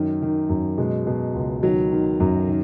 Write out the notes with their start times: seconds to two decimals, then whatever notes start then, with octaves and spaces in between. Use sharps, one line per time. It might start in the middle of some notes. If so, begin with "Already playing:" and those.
Already playing: F#2 D#3
0.22 D#3
0.49 F#2
0.78 B2 G#3
1.07 B2
1.34 C#2
1.63 D#3 F#3
1.91 D#3
2.20 F#2
2.48 D#3